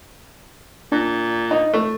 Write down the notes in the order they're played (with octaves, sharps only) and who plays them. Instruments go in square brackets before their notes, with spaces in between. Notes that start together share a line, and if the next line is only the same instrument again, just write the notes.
[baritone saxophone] A#2 [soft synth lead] D4
[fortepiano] D#4
A3